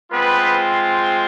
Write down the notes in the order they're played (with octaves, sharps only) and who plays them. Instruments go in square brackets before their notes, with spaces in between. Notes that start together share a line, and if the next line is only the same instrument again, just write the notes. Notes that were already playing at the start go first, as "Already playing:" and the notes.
[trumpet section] G#3 B3 C4 F4 B4